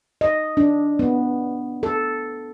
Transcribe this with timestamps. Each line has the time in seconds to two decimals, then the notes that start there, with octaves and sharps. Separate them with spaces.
0.21 D#5
0.57 D4
0.99 B3
1.83 A4